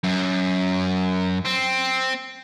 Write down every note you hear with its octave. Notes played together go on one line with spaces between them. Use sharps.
F#2
C4